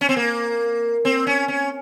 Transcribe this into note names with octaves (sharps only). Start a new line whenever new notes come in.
C#4
C4
A#3
C4
C#4
C#4